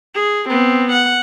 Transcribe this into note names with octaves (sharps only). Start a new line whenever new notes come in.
G#4
B3 C4
F#5